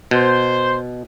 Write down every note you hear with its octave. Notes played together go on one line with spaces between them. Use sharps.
B2 C5